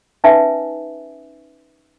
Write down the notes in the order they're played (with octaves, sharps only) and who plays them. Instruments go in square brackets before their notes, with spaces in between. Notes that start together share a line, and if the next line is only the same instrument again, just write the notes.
[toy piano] C#4 D#4 B4 E5 G#5